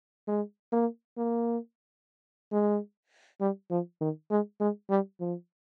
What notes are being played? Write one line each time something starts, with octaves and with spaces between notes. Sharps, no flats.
G#3
A#3
A#3
G#3
G3
F3
D#3
G#3
G#3
G3
F3